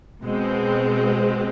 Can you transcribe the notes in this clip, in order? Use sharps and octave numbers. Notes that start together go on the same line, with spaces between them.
B2 G#3 C4